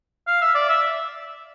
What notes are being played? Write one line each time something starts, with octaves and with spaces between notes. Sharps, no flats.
F5
E5
D5
E5